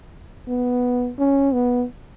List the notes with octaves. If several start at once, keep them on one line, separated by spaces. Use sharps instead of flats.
B3
C#4
B3